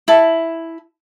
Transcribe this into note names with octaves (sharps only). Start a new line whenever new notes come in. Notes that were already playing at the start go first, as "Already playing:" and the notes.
E4 A5